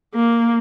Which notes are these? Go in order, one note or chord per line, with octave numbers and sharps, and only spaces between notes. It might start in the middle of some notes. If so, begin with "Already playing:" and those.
A#3